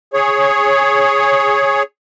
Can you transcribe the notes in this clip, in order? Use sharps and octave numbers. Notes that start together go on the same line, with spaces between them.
G#4 C#5